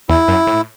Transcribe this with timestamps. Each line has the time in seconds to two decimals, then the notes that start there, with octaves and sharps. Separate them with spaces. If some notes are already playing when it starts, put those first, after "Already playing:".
0.09 E2 E4
0.28 F#2
0.47 A2